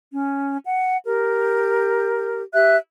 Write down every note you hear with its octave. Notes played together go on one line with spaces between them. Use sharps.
C#4
F#5
G4 A#4
G4 E5 F#6